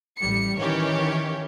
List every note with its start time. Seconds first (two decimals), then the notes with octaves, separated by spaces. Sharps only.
0.19 A1 G3 C#7
0.59 D#3 E3 C#4 G4 C#5